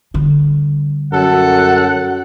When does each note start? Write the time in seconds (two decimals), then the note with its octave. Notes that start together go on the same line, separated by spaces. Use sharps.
0.14 D3 G3
1.13 F#2 A4 F#5